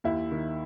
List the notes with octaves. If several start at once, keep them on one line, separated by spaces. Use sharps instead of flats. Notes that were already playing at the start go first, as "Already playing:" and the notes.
D#2 E4
D#3